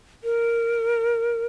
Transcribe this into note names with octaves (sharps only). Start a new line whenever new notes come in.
A#4